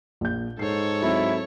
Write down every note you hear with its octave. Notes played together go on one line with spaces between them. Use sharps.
A#1 G6
G#2 A4 C#5 C7
F#3 C4 E4